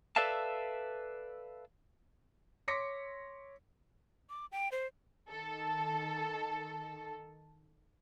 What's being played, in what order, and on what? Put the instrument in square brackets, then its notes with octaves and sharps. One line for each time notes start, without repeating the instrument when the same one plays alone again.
[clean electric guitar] A4 B4 D5 E5 F5 A5
[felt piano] C#5 C6 D6 A#6 B6 C#7
[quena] D6
G5
C5
[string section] D#3 A4